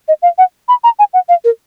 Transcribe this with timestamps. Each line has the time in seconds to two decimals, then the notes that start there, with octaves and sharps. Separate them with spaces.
0.08 D#5
0.22 F5
0.38 F#5
0.68 B5
0.84 A#5
0.99 G#5
1.14 F#5
1.29 F5
1.44 A#4